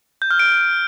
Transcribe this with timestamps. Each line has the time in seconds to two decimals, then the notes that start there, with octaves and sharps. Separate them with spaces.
0.22 G6
0.31 F6
0.39 D7